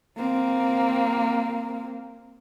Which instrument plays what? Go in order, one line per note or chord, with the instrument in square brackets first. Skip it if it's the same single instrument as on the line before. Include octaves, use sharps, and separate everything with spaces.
[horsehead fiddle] A#3 C4